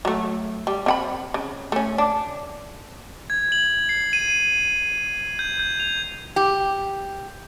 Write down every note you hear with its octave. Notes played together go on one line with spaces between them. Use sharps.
F#3 A3
G3
C4 F#5 B5
C#3
A3 C#4
D4
G#6
F#7
C7
D#7
G6
G6
F7
G4